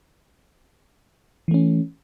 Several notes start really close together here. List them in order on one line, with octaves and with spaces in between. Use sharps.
E3 A3 C#4